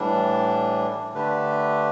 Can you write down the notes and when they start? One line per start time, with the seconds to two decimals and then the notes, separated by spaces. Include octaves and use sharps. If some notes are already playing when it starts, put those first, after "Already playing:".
Already playing: A2 E3 G3 D4
1.14 D3 A3 D4 G4 B4